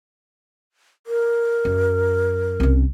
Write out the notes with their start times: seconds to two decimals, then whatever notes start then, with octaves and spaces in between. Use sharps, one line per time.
1.07 A#4
1.65 F#2
2.60 C2 C#4